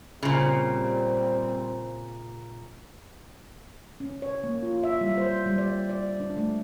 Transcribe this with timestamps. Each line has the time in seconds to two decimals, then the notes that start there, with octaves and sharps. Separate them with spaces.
0.23 A#2 C#3 G3 C4
4.00 C#4
4.22 C#5
4.44 A#3
4.63 F4
4.84 E5
5.01 G3
5.18 C5
5.46 G3
5.58 D5
5.89 D5
6.20 D4
6.37 A3